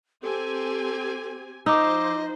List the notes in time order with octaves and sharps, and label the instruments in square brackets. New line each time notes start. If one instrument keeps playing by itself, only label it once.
[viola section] C4 G4 G#5 [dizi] A4
[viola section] F3 C5 [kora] D#4 [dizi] D#5 [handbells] D6 E6